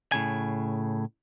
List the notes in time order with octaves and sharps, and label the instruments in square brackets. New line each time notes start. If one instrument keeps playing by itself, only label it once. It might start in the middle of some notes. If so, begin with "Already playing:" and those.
[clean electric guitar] A2 C#3 G#5